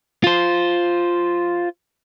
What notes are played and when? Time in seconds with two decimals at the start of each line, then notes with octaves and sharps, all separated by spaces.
0.24 F4 C5